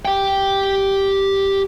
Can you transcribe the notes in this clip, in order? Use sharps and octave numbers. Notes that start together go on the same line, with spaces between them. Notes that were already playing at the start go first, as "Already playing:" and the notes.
G4 G5